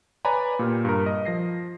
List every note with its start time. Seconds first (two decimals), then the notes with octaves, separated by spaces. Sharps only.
0.25 B4 C#5 D5 G#5 A#5 B5
0.59 A#2 G4 F6
0.85 G2 A#4
1.06 D#5
1.25 F3 A#6 C7